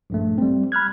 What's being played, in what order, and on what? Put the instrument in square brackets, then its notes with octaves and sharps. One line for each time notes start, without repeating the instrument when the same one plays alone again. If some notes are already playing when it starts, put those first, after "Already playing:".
[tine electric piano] A#1 G2 A3
G3 C4
B5 F6 F#6 G#6